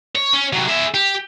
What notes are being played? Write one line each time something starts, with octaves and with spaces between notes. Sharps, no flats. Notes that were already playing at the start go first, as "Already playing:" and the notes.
C#5
C#4
C3 F#3
G#4 E5
G4